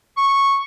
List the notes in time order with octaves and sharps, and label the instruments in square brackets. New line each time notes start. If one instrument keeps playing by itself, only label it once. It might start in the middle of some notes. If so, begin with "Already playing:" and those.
[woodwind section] C#6